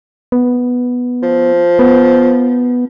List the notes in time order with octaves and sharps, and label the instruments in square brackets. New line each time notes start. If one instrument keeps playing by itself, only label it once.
[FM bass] B3
[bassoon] F3
[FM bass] B3